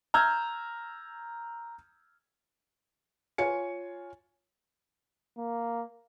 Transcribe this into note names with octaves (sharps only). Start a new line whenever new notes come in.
A#5 E6 F6 G6 G#6
F4 C#5 G#5 C#7
A#3